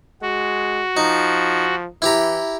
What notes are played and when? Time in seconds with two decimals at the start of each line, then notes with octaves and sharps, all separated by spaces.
0.22 G#3 F#4
0.97 F3 D#4
2.02 E3 E4 G4 A#5